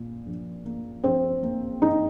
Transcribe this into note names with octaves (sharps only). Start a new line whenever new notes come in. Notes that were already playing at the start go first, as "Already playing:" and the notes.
Already playing: A#2 A#3
A#1
A#3
A#1 C4 C5
A#3
D#4 D#5